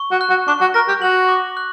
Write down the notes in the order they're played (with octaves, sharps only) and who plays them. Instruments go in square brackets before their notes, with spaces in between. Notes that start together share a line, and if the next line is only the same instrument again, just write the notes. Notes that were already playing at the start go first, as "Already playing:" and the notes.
Already playing: [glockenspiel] C#6
[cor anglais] F#4
[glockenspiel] F#6
[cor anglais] F#4
[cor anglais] D4 [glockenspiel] C#6
[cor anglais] F#4
[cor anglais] A#4 [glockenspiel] A#6
[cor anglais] G4
[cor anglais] F#4 [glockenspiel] F#7
[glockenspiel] D6
F#6